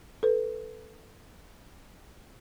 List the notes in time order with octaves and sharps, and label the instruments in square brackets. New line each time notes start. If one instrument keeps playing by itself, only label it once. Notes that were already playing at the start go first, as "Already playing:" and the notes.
[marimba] A4 B4